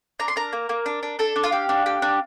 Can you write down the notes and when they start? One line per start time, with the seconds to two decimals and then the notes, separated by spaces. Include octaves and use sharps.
0.20 D4 A#5
0.28 C6
0.36 D4 A#4 A#5
0.53 A#3
0.69 A#3
0.86 D4
1.03 D4
1.19 D4 A4 A5
1.36 D4
1.44 F4 F5
1.52 G4
1.69 D4
1.86 G4
2.02 D4